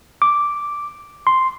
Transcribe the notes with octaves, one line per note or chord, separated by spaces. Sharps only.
D6
C6